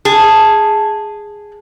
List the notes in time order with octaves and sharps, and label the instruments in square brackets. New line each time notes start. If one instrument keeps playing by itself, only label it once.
[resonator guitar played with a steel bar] G#4 [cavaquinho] A5